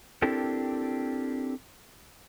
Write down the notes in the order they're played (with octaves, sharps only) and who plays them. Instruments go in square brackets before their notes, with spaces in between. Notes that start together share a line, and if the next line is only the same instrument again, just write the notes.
[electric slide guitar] C4 D4 E4 G4 A4 A#4